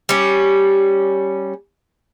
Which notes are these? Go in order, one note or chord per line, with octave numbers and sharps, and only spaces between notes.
G3 C#4